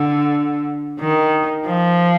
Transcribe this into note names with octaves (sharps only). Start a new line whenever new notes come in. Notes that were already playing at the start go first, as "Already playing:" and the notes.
Already playing: D3
D#3
F3